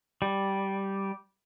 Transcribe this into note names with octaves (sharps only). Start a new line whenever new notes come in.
G3